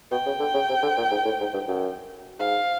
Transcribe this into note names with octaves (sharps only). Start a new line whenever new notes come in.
B2 G5
C#3
D3
C#3
C3
D3
A#2
G#2
A2
G#2
G2
F#2
G#2 F5